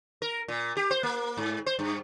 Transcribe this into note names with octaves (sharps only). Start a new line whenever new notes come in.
A#4
A#2
G4
C5
A#3
G#2
C5
G2